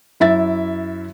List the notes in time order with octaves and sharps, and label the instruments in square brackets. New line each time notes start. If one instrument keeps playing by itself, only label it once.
[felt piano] F#2 E4 E5 A6